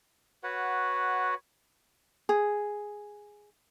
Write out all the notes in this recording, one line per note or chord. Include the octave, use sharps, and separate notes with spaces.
F#4 B4 C#5 F#5
G#4